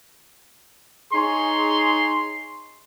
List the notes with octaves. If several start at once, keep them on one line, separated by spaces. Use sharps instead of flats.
D#4 G#4 C#5 C6